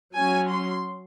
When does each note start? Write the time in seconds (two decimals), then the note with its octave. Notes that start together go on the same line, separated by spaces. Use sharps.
0.15 F#3 C#4 G#5
0.49 C6